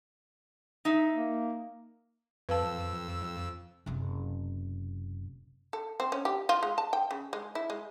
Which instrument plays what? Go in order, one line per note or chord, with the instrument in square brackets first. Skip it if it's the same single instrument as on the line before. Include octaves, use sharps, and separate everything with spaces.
[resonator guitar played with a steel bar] D#4 E5
[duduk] A#3
[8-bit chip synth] F2 E6 [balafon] B4 F5 A5
[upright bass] F#1 C3
[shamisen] A4
C4
C#4
G4
F4
G#3
A5
G5
C#3
G#3
E4
G#3